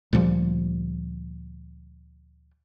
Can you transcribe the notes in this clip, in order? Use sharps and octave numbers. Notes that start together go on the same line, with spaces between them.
D2 A#2 F3 G3